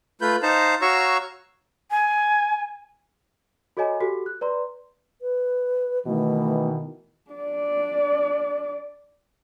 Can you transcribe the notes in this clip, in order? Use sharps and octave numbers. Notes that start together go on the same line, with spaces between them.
A3 F4 B4 B5 G6
D#4 C5 F5 A5 A#5
F#4 C#5 F5 A#5 C#6 E6
G#5
F#4 A4 C#5 D#5 G#5 A#5
F#4 G4 A4
F#6
B4 D5 A#5 C6
B4
B2 D#3 E3 A3
D4 D5